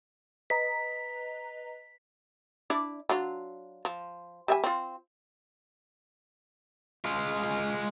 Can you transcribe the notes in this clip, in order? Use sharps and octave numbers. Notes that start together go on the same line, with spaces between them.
B4 D#5 A#5 B6
D4 E4 D5
F#3 D4 F4
F3
G3 E5 G#5
C4 F4
G#3 F4